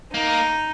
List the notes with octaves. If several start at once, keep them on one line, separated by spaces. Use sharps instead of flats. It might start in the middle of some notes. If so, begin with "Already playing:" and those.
A#3 D#4